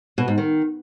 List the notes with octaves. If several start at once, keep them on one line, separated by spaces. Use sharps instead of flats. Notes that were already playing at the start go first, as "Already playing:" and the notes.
B2
G#2
D#3